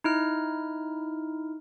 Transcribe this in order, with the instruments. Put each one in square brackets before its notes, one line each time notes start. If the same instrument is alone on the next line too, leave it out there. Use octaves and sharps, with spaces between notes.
[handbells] D#4 E4 F6